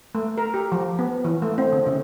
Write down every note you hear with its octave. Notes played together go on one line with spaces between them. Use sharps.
A3
A#4
G4
F3
B3
E3
A3
C4
D3
C#3